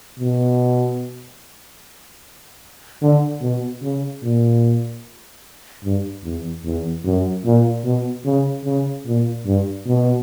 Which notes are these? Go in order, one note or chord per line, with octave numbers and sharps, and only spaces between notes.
B2
D3
B2
C#3
A#2
G2
E2
E2
F#2
A#2
B2
C#3
C#3
A#2
G2
B2